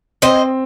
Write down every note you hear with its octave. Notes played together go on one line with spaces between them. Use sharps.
C4 C5 D#5